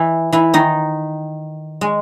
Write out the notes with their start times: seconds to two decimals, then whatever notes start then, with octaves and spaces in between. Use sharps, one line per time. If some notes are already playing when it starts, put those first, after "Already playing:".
Already playing: E3 E4
0.32 E3 E4
0.54 D#3 D#4
1.81 G#3